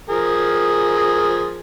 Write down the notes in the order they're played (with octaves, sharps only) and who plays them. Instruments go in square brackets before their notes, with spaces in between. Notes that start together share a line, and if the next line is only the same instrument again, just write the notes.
[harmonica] F3 G#4 A#4